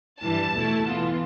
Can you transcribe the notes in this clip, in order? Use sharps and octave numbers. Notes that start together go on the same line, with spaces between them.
G2 E3 G3 A5
E2 B2 A3 E4
E3 B3 F4